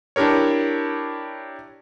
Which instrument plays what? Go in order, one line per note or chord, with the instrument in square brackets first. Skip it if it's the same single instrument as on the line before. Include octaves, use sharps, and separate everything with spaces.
[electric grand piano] D4 E4 G4 A#4 C#5